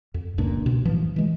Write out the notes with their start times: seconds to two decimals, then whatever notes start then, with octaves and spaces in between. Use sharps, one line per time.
0.14 F2
0.38 F1 C#2 A#2 D4
0.66 B2
0.85 A2 E3 F3
1.16 E3 G#3